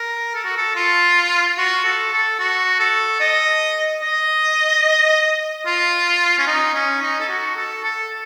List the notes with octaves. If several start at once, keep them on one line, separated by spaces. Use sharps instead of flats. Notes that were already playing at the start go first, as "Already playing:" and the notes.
Already playing: A#4
A4
F#4
A4
F4
F#4
A4
A4
F#4
A4
D#5
D#5
F4
C#4
D#4
C#4
D#4
A4
F#4
A4
A4